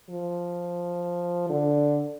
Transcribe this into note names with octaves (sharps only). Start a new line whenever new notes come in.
F3
D3